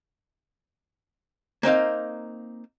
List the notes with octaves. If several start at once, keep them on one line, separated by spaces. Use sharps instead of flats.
A#3 C4 D#4 F5